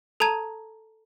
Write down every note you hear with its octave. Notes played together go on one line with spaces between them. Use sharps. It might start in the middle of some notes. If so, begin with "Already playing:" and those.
A4 A5 A#5 G#6 D#7